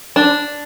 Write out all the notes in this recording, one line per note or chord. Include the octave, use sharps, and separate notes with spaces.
D4